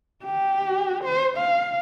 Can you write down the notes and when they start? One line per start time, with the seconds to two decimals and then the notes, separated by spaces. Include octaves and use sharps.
0.24 G4
1.04 C5
1.38 F5